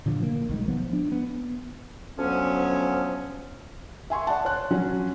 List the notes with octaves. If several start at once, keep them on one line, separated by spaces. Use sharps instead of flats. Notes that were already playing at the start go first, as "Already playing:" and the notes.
A#2 D3 F3
A#3
B1 D#3 G#3
F3 B3
D4
B3
D2 F3 F#3 B3 C#4
E5 G#5 C6 C#6
D5 F#5 A5
C#5 C6 F#6
F#3 C#4 F4 F#4